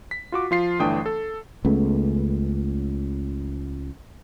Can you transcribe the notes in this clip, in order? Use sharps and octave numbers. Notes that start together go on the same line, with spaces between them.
B6
F4 F#4 D6
F3 F4 C7
G1 E3 A3 D4 G5 D#6
A4
C#2 C#3 A3 B3